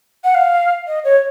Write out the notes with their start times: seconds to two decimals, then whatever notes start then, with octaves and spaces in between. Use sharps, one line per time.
0.24 F#5
0.35 F5
0.87 D#5
1.04 C#5